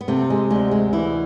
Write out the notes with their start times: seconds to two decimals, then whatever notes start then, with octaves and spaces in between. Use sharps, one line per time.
0.01 B3
0.08 C3 A3
0.30 G#3
0.51 D2 G#3
0.71 G#3
0.93 E3 E4